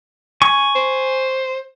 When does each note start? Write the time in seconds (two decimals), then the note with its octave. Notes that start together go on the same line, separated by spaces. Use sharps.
0.42 G#5 C#6
0.75 C5